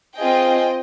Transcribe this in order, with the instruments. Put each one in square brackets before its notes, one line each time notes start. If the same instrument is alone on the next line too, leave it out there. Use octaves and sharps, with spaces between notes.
[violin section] C4 F4 G#4 D#5 G5